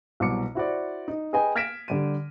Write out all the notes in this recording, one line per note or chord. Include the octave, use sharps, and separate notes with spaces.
C2 B2 F#3 D6 C#7
E4 F#4 C5 D5
D#4
G#4 B4 D#5 G5 G#5
F6 G#6 A#6 B6 D7 E7
D3 G3 D#7